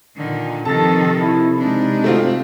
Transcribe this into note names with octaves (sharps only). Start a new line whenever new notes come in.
A#2 D3 D#3
C3 D#3 F3 A4 A5 A6
E4
G#3 D4 D#4
A3 C4 F4